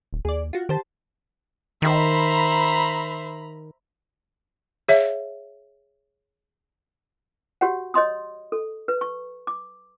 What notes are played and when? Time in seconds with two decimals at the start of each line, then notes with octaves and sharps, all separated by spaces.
0.13 D#1
0.25 D#2 G#4 D5
0.53 F4 F#4
0.69 D#3 G4 C5 A5
1.82 D#3 C5 E5 A#5 B5
4.88 G#4 C#5 E5 F5
7.61 F#4 G4 C#5 F#5
7.94 C#5 D#5 C6 D#6
8.52 A4
8.88 B4
9.01 C#6
9.47 D6